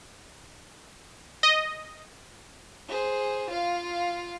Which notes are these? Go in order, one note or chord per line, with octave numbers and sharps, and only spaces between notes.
D#5
G#4 C5
F4 F5